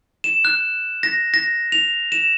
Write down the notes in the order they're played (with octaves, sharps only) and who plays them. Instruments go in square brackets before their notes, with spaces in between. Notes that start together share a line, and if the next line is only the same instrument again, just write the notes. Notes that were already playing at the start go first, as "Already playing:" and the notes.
[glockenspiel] E7
F#6
A#6
A#6
F7
E7